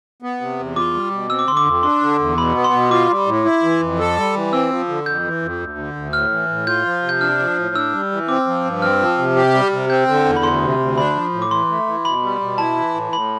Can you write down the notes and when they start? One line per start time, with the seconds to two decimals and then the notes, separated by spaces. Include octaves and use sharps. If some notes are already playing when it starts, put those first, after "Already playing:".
0.22 B3
0.41 C3
0.59 E2
0.76 F4 D6
0.94 G3
1.12 B2
1.30 C4 E6
1.39 D6
1.47 D3 C6
1.57 D6
1.65 F2
1.83 D4 C6
2.01 D3
2.20 E2
2.37 B2 B5
2.55 B3
2.64 C6
2.73 B2
2.91 F4 D6
3.09 G3
3.27 A2
3.45 E4
3.63 E3
3.81 F2
3.99 A4
4.17 G3
4.35 E3
4.53 C4 E6
4.70 F3
4.88 D3
5.06 F2 G6
5.24 E3
5.42 F2
5.60 D2
5.78 D3
5.96 D2
6.13 A2 F6
6.31 E3
6.49 A2
6.67 F4 G6
6.85 F3
7.03 C3
7.09 G6
7.21 D4 F6
7.39 F3
7.57 A2
7.75 D4 E6
7.93 G3
8.11 E3
8.29 C4 D6
8.47 F3
8.65 G2
8.82 C4 F6
9.00 F3
9.18 C3
9.36 G4
9.54 G3
9.72 C3
9.90 C4 G6
10.08 D3
10.25 E2
10.36 B5
10.43 D2 C6
10.62 C3
10.79 D2
10.98 D4 B5
11.16 F3
11.33 A2
11.42 D6
11.51 E3 C6
11.69 A3
11.87 E3
12.05 B2 B5
12.22 G3
12.41 B2
12.58 E4 A5
12.77 E3
12.94 A2
13.12 A2 B5